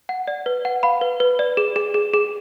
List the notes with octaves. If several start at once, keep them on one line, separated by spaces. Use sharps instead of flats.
F#5
D5
B4
F#5
F5 B5
B4
B4
D5
G#4
G#4
G#4
G#4